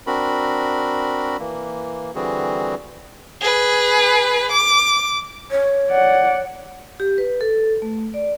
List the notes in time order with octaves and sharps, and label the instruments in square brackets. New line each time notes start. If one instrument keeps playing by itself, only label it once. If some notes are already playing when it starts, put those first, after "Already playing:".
[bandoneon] C4 D4 F#4 A#4 B5
E3 A#3
D3 E3 G3 C4 F#4 G#4
[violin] G#4 B4
D6
[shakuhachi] C#5
[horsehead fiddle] D5 F#5
[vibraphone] G4
B4
A4
A3
D5